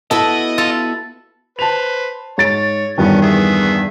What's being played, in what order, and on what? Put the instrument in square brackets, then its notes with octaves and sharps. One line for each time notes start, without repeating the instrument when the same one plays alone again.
[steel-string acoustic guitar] B3 E4 F#4 [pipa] A4 [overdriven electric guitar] D#5
[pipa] F4 [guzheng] A4
[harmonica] B4 C5 [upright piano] A5 F7
[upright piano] G#2 A6 D7 [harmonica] C#5
[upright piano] E2 G2 D#3 [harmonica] B3 C#4
[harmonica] B3 G#4 E5